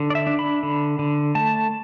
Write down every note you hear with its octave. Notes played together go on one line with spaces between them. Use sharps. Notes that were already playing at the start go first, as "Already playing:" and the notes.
Already playing: D3
D5
E5
D4
B5
D3
D3
A3 A5